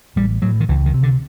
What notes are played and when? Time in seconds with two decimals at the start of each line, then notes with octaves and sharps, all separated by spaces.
0.16 A1 G3
0.42 A2 F#3
0.60 D#3
0.69 C#2 E3
0.86 D#3
0.94 C3
1.03 D3